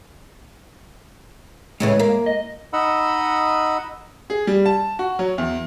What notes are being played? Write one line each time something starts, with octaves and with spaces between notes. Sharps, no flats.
A2 C#3 E3 G#3
A#3
D#5
D#4 D#5 F#5 B5 E6
G#4
G3
A5
F#4
F#3
E2